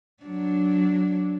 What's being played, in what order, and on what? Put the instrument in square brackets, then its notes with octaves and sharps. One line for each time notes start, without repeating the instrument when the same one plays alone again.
[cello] F#3 D4